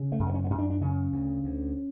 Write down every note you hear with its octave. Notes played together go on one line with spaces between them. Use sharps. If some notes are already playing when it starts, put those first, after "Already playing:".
Already playing: C#3
A3
F#2
B3
C#4
B3
F#2 C#4
D4
D4
C#3 C#4
D2
D2